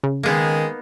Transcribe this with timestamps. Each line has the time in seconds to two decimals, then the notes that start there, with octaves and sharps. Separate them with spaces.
0.04 C#3
0.23 D#3 G#3 A#3 B3 D#4